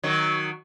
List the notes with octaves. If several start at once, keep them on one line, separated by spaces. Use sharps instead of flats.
D#3 F#3